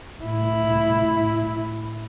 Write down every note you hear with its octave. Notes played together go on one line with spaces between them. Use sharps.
A2 E4